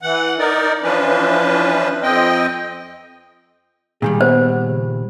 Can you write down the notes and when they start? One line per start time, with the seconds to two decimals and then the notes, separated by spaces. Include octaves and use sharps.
0.02 E3 F#5
0.39 D#4 A#4 D5
0.83 E3 F3 C#4 D4 B4
2.02 F2 C4 D#5 G5
4.02 A#2 D#3 G3 G#4
4.21 B3 C5
4.64 C#3